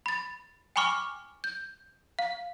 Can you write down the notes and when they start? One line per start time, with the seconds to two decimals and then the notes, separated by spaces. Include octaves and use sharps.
0.06 B5 A6
0.76 G5 G#5 B5 C#6 D6 F6
1.44 G6
2.19 F5